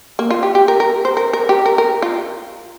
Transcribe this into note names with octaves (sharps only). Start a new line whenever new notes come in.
A#3
F4
G4
G4
A#4
A#4
C5
A#4
A#4
G4
A#4
A#4
F4